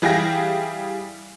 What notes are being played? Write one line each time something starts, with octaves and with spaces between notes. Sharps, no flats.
E3 G3 G#4 F5 G5 A#6